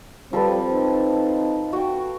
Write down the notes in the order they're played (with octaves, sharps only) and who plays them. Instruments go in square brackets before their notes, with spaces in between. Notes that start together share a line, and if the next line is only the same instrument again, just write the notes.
[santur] F3 A4 B4 [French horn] G3 [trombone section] C4
[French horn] D#4
[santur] F#4 G5